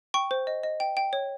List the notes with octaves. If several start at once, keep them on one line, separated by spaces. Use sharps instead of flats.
G5 C#6
C5
D#5
D#5
G5
G5
C#5